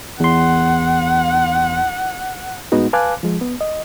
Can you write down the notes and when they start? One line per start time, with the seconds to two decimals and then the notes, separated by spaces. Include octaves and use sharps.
0.20 E2 F#5 C6
2.72 A2 G#3 B3 D#4 F#4
2.93 B4 F5 G#5 A5 D6 F#6
3.23 F3 G#3
3.41 B3
3.61 D#5